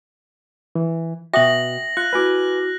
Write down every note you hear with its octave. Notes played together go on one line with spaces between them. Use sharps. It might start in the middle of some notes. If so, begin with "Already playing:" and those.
E3
B2 F#4 E5 G5 D#6 A#6 F#7
F4 F#6 C#7
E4 F#4 B4 G#5 D6 F6